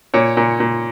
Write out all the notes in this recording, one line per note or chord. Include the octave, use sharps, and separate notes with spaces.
A#2 C#5
A#2
A#2